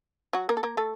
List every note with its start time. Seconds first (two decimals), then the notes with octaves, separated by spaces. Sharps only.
0.33 F#3 F#4
0.49 A#3 A#4
0.57 A4
0.63 A#3 A#4
0.77 A3 A4